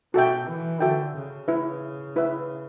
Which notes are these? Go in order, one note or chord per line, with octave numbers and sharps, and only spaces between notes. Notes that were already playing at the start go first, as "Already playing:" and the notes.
B2 F#4 A4 E5 G5
E3
D3 F#4 A4 E5 G5
C#3
E4 B4 E5
E4 B4 E5